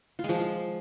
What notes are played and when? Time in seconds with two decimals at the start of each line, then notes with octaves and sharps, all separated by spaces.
0.19 F4
0.24 G#3
0.29 F3